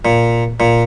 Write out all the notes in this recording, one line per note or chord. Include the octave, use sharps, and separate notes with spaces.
A#2
A#2